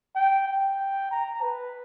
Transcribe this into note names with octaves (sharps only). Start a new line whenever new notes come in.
G5
G5
A#5
B4